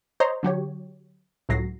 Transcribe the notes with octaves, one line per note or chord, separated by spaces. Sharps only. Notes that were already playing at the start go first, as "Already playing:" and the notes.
C5 C#5 D#5 A#5 C6
D3 F#3 G4 C#5
C#2 A2 F#3 A#6 C7